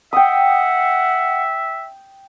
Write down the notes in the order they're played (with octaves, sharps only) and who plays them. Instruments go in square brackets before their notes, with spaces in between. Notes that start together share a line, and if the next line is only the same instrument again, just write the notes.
[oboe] E5 [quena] F#5 [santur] G5 D#6